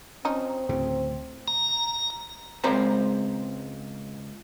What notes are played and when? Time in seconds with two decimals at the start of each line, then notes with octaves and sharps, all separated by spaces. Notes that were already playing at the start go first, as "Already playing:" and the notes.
0.25 F3 C4 C#4 D#4
0.69 D2 A2 C#3 C4
1.48 A#5
2.64 C#2 G#3 C4 C5 A#5 B5